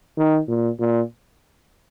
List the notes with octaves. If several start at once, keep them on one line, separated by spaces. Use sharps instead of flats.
D#3
A#2
A#2